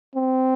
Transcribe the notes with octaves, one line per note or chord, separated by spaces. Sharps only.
C4